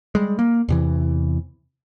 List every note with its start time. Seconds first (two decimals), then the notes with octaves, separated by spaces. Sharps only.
0.15 G3 G#3
0.39 A#3
0.69 E2 C3 E3